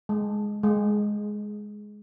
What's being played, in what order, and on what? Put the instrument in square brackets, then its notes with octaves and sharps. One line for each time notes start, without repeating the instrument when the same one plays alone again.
[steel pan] G#3
G#3